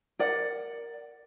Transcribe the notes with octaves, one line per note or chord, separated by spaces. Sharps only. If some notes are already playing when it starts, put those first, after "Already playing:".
A#4 D5 F#5